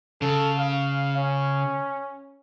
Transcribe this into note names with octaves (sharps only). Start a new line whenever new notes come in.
C#3 A4
F5
C#4